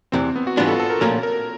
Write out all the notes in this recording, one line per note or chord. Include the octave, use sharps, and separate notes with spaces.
E2 C3 E3 C4
B3
F#4
G#2 E3 G3 B3 D4 F4
A4
A4
A#4
C2 A#2 F3 A3 C#4 A#4
A#4